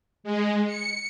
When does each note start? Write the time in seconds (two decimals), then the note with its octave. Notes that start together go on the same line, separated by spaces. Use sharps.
0.24 G#3
0.67 C#7